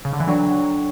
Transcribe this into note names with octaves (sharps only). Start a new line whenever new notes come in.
C#3
D3
E3
F#3 D4 A4 D5 G5 C#6